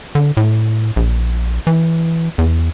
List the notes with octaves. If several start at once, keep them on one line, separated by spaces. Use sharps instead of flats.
D3
A2
A#1
E3
E2